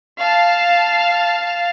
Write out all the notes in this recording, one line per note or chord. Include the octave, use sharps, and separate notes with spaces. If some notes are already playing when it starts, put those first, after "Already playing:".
F5 A5